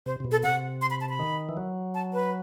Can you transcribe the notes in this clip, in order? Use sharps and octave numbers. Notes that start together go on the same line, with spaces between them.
C3 C5
C3
B2
A4
C3 F#5
C6
B5
A5
B5
D#3
E3
F#3
A5
B4